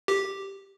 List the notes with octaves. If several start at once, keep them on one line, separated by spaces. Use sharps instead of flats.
G4